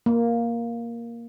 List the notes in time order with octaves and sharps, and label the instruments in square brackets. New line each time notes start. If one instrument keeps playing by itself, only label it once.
[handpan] A#3